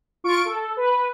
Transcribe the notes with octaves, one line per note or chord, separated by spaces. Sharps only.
F4 C#6 D7
A4
B4